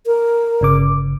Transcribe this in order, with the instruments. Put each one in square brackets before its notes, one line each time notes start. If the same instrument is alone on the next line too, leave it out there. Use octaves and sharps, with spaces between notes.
[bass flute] A#4
[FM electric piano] G1 C#3 D6